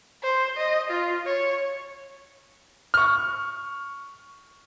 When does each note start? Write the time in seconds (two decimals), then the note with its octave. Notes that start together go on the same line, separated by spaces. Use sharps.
0.23 C5
0.57 D#5
0.90 F4
1.26 C#5
2.94 C#6 F6